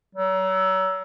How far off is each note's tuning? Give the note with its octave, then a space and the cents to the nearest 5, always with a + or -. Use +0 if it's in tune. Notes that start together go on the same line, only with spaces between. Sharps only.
F#3 +35